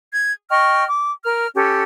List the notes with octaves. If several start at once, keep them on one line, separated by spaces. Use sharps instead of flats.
G#6
D#5 G5 C#6 F6
D6
A#4 F6
C#4 G4 A4